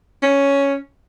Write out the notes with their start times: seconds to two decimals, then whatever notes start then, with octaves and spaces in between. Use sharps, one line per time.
0.22 C#4